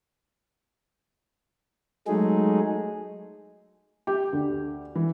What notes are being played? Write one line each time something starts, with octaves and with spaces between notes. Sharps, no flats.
F#3 G#3 A3 D#4 G#4
G4
D2
E3